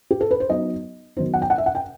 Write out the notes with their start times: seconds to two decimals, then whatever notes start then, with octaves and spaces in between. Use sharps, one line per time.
0.11 G4
0.21 A4
0.31 B4
0.40 C5
0.50 F#3 B3 D#4 D#5
1.17 D#3 F#3 B3 D#4 C5
1.34 F#5
1.42 G5
1.50 F#5
1.58 E5
1.66 F#5
1.75 G5